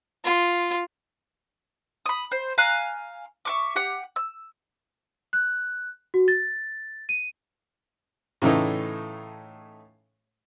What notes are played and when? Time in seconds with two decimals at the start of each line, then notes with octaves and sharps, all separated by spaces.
0.25 F4
2.06 B5 D#6
2.32 C5
2.58 F5 G#5 A#5 F#6
3.45 E5 C#6 D6
3.76 G4 F#5
4.16 E6
5.33 F#6
6.14 F#4
6.28 A6
7.09 D#7
8.42 A2 C#3 E3 A3 D#4